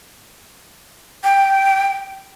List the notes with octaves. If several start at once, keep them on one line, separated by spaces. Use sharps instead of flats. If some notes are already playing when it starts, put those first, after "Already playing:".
G5